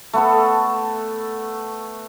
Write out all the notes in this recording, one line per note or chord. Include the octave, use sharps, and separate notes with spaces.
A3 B3 A4